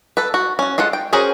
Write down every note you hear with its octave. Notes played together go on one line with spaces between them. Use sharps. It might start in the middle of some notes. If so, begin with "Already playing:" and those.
A4 B4
F#4
C#4 F#4
G#3 F4 A4 F#5
G5
C#4 F#4 G#4 A#4 C5